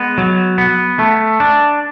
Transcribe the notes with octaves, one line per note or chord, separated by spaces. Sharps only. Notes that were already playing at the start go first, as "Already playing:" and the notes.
Already playing: G#3 B3
F#3
B3
A3
D4